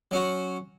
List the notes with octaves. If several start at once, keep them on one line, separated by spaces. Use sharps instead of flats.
F#3 C#4 F#4